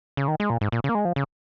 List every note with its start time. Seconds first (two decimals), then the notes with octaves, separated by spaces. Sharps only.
0.17 C#3
0.28 D#3
0.40 G#3
0.50 A#2
0.61 G#2
0.72 A#2
0.84 C#3
0.89 A#3
0.95 G#3
1.05 F3
1.16 C#3